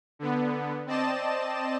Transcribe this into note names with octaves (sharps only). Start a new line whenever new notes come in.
D3 B3
C4 D5 D#5 A5 E7